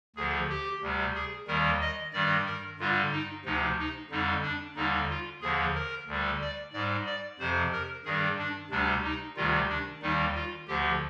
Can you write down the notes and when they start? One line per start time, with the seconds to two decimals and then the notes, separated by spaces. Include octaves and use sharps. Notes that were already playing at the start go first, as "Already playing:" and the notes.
0.16 D2 D3 F3 G#4
0.49 G4
0.82 D2 C3 G3
1.15 G#4
1.48 D#2 D#3 G3 A#4
1.81 D#5
2.13 G2 D#3 G3 D5
2.46 A#4
2.79 G2 D3 G3 F4
3.12 D#4
3.45 D2 C3 F3 D#4
3.78 D#4
4.10 F2 D3 G3 D#4
4.43 D4
4.76 D#2 D3 G3 D#4
5.09 F4
5.42 D#2 D3 F3 G#4
5.75 A#4
6.07 D2 D3 G3
6.41 D5
6.73 G#2 G3 D5
7.06 D5
7.39 F2 C3 F3 C5
7.73 A#4
8.05 G2 D#3 G3 G#4
8.38 D4
8.70 D2 C3 G3 D4
9.04 D#4
9.36 D2 C3 D#3 G3 F4
9.69 D4
10.02 D#2 D#3 G3 D#4
10.34 F4
10.67 D2 D3 F3 G4